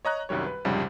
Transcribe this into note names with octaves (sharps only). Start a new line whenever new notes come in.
C#5 D#5 A#5 F#6
C2 F#2 D#3 G3 C#5
B4
C2 F2 G#2 C#3 G3